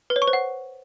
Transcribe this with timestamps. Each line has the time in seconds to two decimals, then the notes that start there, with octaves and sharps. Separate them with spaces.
0.10 B4
0.16 C#5
0.22 C#6
0.28 C5
0.33 F#5